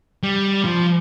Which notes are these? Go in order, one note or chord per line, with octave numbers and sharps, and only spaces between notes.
G3
F3